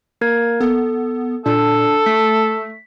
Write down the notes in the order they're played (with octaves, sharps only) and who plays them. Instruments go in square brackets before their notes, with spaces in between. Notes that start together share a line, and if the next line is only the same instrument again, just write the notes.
[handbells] A#3 A#4 G#6
[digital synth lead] B3 [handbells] A4
[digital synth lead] A#2 [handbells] D4 [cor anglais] A4
[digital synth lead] A3 [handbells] B6